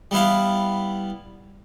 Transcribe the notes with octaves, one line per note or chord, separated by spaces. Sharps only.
G3 B3 E4 F5